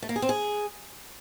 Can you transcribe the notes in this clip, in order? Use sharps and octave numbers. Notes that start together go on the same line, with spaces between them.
A3
A#3
G#4
C4
G#4